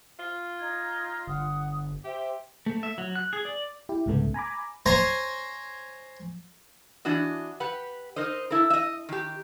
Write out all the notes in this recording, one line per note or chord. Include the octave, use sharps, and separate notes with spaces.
F4
D#4 G#6
G1 F#5 D#6
G4 C5 E5 G5
A3
E5
F#3
F#6
G#4
D5
E4 G4
C2 G#2 C#3 A3 B3
G#5 A#5 B5 D6
C5 C#5 G#5 A#5 C6
E3 D4 F#4 D#5
G4 B4 F#5
D#4 A#4 C5 D#5
E4 A4 A#4
D#5 E5
D#3 G4